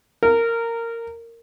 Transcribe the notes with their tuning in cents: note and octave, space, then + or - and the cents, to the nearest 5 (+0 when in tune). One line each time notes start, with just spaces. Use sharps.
A#4 -15